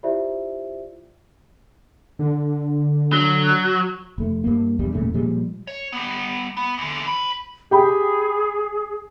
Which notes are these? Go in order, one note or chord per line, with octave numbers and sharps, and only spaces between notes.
E4 F4 G4 C5 D5 E5
D3
F#3
F1 A3
G2 A#3
B1 E2 G2 G3
E1 A#2 C#3 A3
A#2 F3 G3 G#3
C#5
G3 B3
B3
E2 D3
C5 B5
G4 G#4 G5 B5